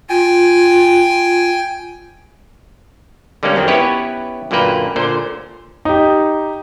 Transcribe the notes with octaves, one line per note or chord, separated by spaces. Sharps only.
F4 G5 G#5
D3 G3 G#3 A#3 C#4
F#2 D#3 C4
B3 C#4 E4 G4 B4 C#5
F#2 A#2 D3 A#3 B4 G5
A#2 D3 C5
D#4 G4